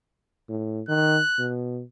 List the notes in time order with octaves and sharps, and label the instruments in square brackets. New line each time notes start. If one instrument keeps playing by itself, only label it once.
[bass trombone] A2
[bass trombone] D#3 [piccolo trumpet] F#6
[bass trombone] B2